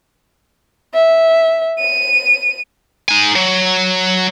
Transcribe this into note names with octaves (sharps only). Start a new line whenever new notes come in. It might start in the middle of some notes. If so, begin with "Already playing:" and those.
E5
D#7
D#4 G#5
F#3